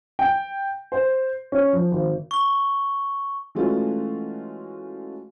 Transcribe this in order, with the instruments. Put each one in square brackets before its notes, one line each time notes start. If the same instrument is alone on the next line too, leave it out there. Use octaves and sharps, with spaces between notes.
[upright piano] G5
C5
C#4
F3
G#1
[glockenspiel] C#6 G7
[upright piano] E3 G#3 A3 C#4 F4 F#4